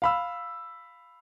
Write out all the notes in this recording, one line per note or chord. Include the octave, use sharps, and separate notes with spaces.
F5 B5 E6